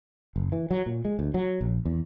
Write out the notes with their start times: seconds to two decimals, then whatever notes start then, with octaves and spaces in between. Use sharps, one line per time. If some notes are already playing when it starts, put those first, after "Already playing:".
0.36 F#1
0.52 E3
0.71 F#3
0.86 A#2
1.05 G#3
1.19 D2
1.34 F#3
1.61 A#1
1.85 E2